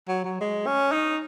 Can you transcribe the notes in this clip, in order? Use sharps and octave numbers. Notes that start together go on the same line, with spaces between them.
F#3
F#3
G#3
C#4
D#4